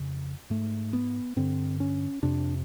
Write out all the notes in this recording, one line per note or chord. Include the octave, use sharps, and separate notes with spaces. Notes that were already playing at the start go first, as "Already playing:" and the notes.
Already playing: F2 C#3
G#2 A3
B3
G2 D3 C4
C#4
F2 C3 D4